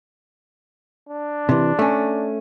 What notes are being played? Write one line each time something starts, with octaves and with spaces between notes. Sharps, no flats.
D4
C3 E3
A3 C#4